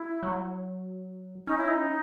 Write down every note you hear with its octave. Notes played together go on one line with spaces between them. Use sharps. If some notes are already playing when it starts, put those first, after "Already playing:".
Already playing: E4
F#3
C#4 D#4
E4
D#4